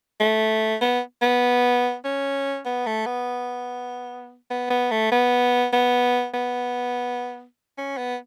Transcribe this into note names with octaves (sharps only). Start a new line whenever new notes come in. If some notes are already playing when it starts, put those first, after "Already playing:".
A3
B3
B3
C#4
B3
A3
B3
B3
B3
A3
B3
B3
B3
C#4
B3